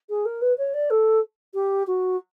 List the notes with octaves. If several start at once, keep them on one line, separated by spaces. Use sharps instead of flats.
G#4
A#4
B4
C#5
D5
A4
G4
F#4